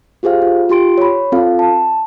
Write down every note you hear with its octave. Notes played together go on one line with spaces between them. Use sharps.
F4 G4 G#4 C5 F5
F4
F4 G4 C6 D7
C#5 B5
C4 F4 A4 F5
A5